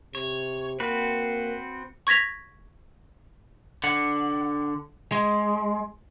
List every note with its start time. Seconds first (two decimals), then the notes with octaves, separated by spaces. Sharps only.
0.15 C3 C#5
0.80 A#3 C4 F#4 B4
2.07 C#6 G#6 A#6 B6 F7
3.84 D3 F#5
5.12 G#3